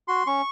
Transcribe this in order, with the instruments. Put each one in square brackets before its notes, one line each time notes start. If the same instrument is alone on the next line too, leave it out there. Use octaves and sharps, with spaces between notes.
[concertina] F#4 C6
C#4 C#6